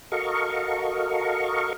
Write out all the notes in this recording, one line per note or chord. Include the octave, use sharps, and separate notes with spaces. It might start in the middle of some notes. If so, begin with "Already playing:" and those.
F#4 A4 A#4 D#5 F5 C#6